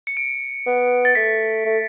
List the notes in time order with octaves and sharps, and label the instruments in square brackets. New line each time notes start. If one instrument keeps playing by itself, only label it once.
[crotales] C#7
D7
[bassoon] B3
[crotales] A6
[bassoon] A3 [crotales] B6
[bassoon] A3